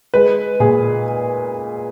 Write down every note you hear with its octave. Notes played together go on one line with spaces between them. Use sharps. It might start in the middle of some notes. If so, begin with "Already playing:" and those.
G#3 B4
A#2 G#4